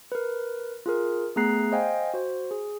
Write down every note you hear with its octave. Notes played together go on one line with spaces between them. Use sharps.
A#4 B4
F4 G#4 A#4
A3 B3 G#4 A#5 F#6 C7
C5 D#5 F5 G5 G#5
F#4 C5
G#4